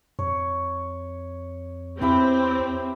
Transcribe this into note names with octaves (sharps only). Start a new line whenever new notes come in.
F2 C#5
E2 C4 E4 G4 B4